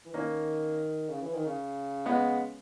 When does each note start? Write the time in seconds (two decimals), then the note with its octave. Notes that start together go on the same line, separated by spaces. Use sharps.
0.06 E3
0.14 D#3 A#3 C#4
1.10 C#3
1.22 E3
1.34 D#3
1.46 C#3
2.06 G#3 B3